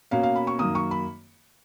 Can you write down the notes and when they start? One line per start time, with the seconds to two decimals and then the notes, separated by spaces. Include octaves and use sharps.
0.11 B2 A#3 C#4 F5
0.23 F5
0.36 B5
0.47 C#6
0.59 F#2 D#3 A#3 D#6
0.75 C#6
0.91 B5